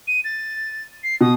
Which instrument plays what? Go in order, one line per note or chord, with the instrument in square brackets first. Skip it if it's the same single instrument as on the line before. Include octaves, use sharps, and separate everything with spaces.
[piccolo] D#7
A6
C7
[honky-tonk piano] B2 [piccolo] D#6